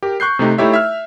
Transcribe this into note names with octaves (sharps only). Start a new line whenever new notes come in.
G4 A#4
C#6 F#6 G6 C7
C3 A3 D#4 G4
A3 D#4 E4 G4 C#5 E5
E5 F6